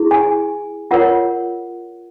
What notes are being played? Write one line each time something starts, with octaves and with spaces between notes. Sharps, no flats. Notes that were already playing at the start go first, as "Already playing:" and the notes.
Already playing: E4 G#4
G#5
F4 A#4 C#5 F#5